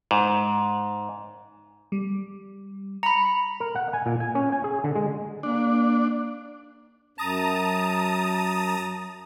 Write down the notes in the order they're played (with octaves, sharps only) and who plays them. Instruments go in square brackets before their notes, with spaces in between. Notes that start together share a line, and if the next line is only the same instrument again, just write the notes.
[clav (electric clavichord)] G#2
[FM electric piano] G3
[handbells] A#5 B5 [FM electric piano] C#7
[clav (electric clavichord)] A#4
F#5
G#5
A#2
G#5
C#4
G#5
G#4
D3
G#3
[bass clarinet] A#3 [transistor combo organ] D4
[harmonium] F#2 [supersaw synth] A5 A#5 D#6